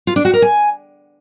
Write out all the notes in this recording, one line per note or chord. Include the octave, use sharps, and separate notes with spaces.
F4
D4
F#4
A#4
G#5